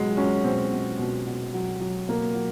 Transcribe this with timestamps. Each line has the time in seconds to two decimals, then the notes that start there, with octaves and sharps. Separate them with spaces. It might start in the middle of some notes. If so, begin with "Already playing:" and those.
Already playing: B2 F#3 G#3
0.17 F#3 C#4
0.44 B2 C4
0.71 B2
0.99 B2
1.26 B2
1.54 F#3
1.80 F#3
2.08 B2 A#3
2.35 F#3